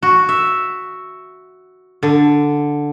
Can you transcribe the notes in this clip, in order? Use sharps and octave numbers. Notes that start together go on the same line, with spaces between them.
F#4
E5
D3